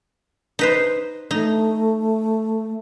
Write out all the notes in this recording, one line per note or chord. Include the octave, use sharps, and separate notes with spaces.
D#4 B4 C5
A3 D#4